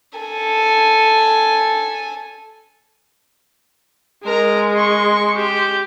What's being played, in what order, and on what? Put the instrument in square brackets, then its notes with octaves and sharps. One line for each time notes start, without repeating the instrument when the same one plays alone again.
[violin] A4 G#5
[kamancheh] G#3 [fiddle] A#4 A#5
[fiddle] C6 C#6
G4